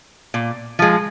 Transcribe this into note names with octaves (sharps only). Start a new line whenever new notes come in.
A#2
F3 G#3